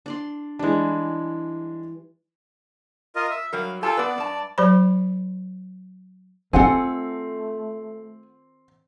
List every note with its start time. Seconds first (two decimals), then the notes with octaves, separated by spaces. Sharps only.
0.06 D4 D5 C6
0.59 E3 G3 G#3 D4
3.16 F4 A#4 D#5
3.31 E5
3.53 F#3 G3 A#4 F5
3.83 F4 G4 A4 G#5 A5
3.97 B3 B4 D5
4.18 G2 A5
4.58 F#3 C5 D5 B5
6.53 D#3 A3 C4 F4 A4 F#5 G#5